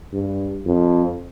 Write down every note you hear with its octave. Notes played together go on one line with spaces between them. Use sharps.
G2
F2